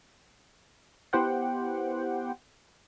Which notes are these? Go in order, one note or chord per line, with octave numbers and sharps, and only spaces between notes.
B3 E4 G4 C5 F#5 G5